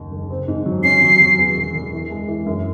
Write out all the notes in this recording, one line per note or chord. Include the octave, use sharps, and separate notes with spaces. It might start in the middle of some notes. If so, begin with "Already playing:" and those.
Already playing: F#1 D#2 D#3
F#1
C4
G#2
F#3
C#4 C7
F#3
F#3
E2
E1
E1
E3
G#3
E3
F#2